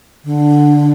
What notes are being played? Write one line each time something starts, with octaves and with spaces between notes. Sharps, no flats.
D3